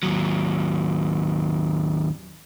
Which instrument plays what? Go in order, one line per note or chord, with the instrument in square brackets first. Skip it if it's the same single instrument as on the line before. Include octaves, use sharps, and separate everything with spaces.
[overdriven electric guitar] D#2 F#3